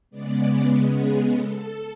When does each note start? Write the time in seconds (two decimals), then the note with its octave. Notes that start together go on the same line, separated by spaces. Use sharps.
0.10 C#3 G#3 B3 D5
0.92 G#4
1.32 A4